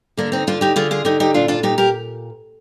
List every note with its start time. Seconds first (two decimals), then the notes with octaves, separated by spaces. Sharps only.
0.17 D3 A#3 D4
0.32 C4 D#4
0.47 D3 D4 F4
0.61 D#4 G4
0.76 D3 F4 G#4
0.91 F4 G#4
1.05 D3 D#4 G4
1.20 D#4 G4
1.34 A#2 D4 F4
1.48 D4 F4
1.63 A#2 D#4 G4
1.78 G4 A#4